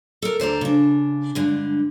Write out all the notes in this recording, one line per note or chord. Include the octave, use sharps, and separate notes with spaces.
A4 A#4
D2 C5 D5 A#5
C#3 D4
G2 D3 G#3